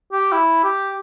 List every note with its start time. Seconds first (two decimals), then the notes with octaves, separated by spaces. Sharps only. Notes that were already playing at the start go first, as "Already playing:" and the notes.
0.12 G4
0.32 E4
0.64 G4